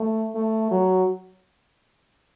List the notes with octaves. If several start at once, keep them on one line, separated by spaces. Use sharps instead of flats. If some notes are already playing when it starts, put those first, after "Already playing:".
Already playing: A3
A3
F#3